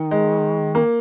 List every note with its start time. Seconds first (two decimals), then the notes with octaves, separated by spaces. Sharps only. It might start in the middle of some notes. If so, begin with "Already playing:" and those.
Already playing: D#3
0.11 G#3
0.75 A#3